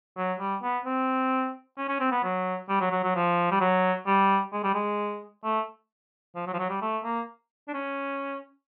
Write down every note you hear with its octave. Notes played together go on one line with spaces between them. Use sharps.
F#3
G3
B3
C4
C#4
C#4
C4
B3
F#3
G3
F#3
F#3
F#3
F3
G3
F#3
G3
G#3
G3
G#3
A3
F3
F#3
F3
F#3
G3
A3
A#3
D4
C#4